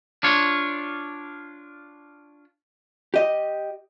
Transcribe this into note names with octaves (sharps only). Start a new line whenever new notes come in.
D4 F4 C#5
G4 D#5